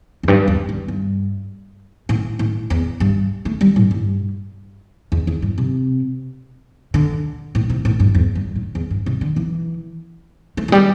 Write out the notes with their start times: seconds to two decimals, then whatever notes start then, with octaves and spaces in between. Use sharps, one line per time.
0.23 E2
0.28 G2
0.48 E2
0.69 G2
0.88 G2
2.09 A2
2.39 A2
2.70 E2
3.00 G2
3.45 A3
3.61 G3
3.76 A2
3.91 G2
5.12 E2
5.27 E2
5.42 G2
5.58 C3
6.94 D3
7.55 A2
7.70 C3
7.85 A2
8.00 G2
8.15 E2
8.35 G2
8.56 A2
8.75 E2
8.90 G2
9.06 C3
9.21 D3
9.36 E3
10.57 A3
10.68 E3
10.72 G3